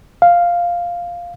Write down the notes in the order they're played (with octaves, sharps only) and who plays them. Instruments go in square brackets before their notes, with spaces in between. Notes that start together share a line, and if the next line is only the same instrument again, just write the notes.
[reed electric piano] F5